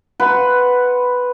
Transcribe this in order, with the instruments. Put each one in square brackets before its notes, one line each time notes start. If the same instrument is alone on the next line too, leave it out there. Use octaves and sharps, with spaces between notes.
[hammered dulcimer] B4 F#5 C6